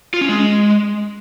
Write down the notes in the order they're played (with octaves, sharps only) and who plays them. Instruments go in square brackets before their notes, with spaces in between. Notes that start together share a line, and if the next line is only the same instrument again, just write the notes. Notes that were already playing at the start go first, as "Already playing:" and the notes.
[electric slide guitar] F4
C#4
G#3